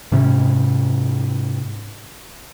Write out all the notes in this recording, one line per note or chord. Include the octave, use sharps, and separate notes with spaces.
G#2 C3 C#4